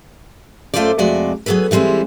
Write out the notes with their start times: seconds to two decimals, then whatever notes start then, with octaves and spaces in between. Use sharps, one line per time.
0.74 F#2 A3 F4 A4 C5 D5
0.98 F2 C3 G#3 A3 F#4 D5
1.46 F#3 B3 G#4 A4 B4
1.71 E3 G3 G#3 C4 E4